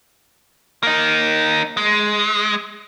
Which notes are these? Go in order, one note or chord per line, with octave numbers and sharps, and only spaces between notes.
A#3 D#4
G#3